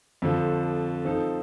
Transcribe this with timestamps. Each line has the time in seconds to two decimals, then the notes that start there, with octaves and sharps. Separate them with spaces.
0.22 F2 D3 F3
1.05 F3 C4 D#4 A4